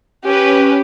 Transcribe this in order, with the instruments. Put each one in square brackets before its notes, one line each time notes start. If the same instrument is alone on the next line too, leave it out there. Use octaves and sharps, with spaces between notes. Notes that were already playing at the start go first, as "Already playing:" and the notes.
[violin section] C#4 B4 [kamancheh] G4